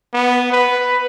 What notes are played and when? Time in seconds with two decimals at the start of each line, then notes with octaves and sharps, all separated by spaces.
0.14 B3
0.52 B4